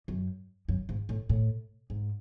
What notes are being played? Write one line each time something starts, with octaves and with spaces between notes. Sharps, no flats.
F#2
F#2
G#2
A2
A2
G#2